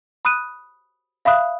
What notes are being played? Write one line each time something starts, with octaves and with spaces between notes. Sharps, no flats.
B5 D#6 F#6 D#7
E5 F5 B5 D#6 F#6